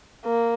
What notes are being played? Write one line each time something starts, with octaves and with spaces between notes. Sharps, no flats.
A#3